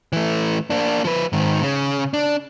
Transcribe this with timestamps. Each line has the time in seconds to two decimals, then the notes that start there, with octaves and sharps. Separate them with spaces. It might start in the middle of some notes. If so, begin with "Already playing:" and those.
0.13 E3 A3
0.70 A#3 D4
1.04 F3 B4
1.33 G#2 D#3
1.62 C#3
2.13 D4